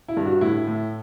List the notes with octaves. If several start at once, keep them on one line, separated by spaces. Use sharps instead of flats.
E4
G2
F#4
A2 E4
A2